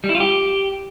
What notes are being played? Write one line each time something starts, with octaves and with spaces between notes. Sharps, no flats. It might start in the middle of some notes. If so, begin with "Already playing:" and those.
G3
E4
F4
G4